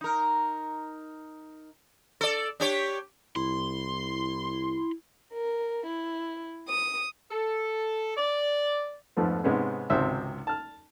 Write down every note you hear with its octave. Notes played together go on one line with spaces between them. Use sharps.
D#4 A#4
A4 D5
D4 G4 C#5
C2 E4 C6
A#4
E4
D#6
A4
D5
F2 G#2 F3 A3 B3
G#2 C3 G#3 B3 C#4
G#1 C#2 C3 C5 E5
A5 F6